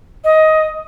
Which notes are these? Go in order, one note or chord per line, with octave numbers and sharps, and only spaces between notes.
D#5